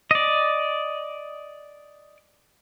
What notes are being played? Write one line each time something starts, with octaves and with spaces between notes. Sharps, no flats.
D5 D#5